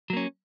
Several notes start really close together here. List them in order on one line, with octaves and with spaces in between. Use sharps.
F#3 A#3 C#4